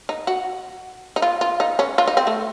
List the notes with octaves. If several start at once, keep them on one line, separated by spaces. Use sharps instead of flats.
D#4
F#4
D#4
F4
F4
D#4
C#4
F4
D#4
C4
A3